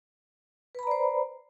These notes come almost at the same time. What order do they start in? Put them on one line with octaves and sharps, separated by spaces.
B4 B5 A#5 D5 C5